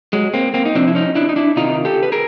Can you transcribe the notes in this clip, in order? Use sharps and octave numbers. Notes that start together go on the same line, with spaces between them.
F#3 G#3
A#3 C4
A#3 C4
D#4
C3 F3 C4 D4
E4
C#4 D#4
D4 E4
D#4
D4 E4
C3 D#3 D#4 F4
G4 A4
B4
G#4 A#4